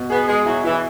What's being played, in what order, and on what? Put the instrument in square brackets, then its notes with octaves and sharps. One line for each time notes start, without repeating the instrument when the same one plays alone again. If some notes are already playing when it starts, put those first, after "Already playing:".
Already playing: [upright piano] B2
[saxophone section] B3 [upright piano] G#4
[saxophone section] G#3 [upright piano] G#4
[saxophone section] F#3 [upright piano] E4
[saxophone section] E3 [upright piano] E4